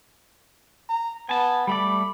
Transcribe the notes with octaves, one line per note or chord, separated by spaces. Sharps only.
A#5
B3 G#5 A5
G3 A3 D5 B5